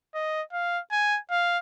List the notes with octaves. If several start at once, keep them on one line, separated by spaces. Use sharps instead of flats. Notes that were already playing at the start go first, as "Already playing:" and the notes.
D#5
F5
G#5
F5